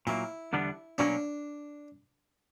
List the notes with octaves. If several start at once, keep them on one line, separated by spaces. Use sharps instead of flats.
A#2 F#3 A#3 E4
E2 D3 G3 B3 D4
B2 F#3 A#3 C#4 D4